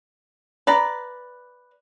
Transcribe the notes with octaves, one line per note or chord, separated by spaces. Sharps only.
B4 D5 A#5